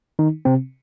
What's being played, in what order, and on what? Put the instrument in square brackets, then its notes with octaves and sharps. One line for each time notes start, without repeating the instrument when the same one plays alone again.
[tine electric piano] D#3 D#4
C3 C4